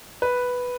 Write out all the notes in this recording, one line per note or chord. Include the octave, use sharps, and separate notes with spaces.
B4